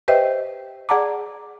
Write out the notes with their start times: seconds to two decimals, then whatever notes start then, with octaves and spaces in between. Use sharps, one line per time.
0.08 G4 B4 C5 D#5 E5 G5
0.89 G#4 D5 F#5 A5 A#5 D6